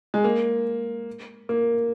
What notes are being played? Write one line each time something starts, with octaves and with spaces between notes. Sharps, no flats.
G#3
A#3
A#3